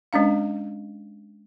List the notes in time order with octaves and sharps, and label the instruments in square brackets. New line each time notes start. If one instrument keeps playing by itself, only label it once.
[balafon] G#3 C#4 D4 F5